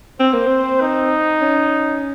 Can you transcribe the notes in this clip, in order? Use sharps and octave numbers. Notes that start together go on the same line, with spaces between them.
C4 C5
A#3
C4
D#4
C#4